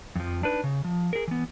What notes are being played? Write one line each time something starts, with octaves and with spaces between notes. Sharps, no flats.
F2 F3
D4 D#4 B4
C#3
F3
G#4 A#4
E3 B3